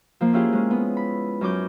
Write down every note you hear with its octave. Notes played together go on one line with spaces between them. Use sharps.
F3 A#3
C#4 E4 F4 G4 G#4
G#3 C#4
B3
B5
F#2 C#4 D6 G6